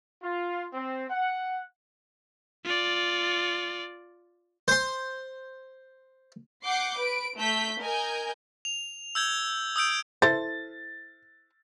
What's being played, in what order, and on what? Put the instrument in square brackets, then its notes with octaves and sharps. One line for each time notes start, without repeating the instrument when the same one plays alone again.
[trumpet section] F4
C4
F#5
[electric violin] F4 D5
[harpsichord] C5 C6
[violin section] F#5 D6 G6 C7
B4 D7
A3 G6 B6
A#4 D#5 G#5 G6
[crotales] F7
E6 G6 G#6 G7
D#6 E6 G6 D7
[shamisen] E4 A4 C5 [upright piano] A6